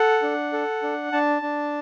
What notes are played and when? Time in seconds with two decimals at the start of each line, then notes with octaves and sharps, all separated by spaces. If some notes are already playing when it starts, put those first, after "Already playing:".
Already playing: A4 F#5
0.22 D4
0.53 A4
0.83 D4
1.12 D4 A5
1.42 D4